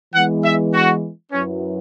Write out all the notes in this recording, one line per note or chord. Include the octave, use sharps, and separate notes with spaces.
E3 G#3 B3 F#5
E5
F#4
F#2 F#3 C#4 E4 B4